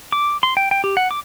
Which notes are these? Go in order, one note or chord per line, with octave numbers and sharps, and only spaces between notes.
D6
C6
G5
G5
G4
F#5
D6